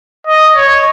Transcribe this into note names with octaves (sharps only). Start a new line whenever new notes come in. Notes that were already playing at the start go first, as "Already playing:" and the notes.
D#5
C#5